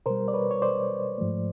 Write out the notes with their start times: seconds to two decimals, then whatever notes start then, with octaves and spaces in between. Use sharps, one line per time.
0.06 B2 G3 A#4 C5
0.28 D5
0.33 B4 C#5
0.51 C#5
0.62 C5 D5
1.18 G#2 F3 A3